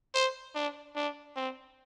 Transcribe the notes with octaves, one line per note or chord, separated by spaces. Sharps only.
C5
D4
D4
C4